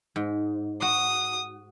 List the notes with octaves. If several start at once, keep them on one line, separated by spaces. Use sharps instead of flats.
G#2
F#4 D#6